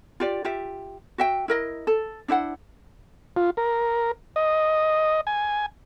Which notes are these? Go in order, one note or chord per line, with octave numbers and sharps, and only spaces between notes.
F4 G4 D5
F4 G4 E5
F#4 E5 G5
E4 A#4 D#5
A4
D4 E4 C5 F#5
F4
A#4
D#5
G#5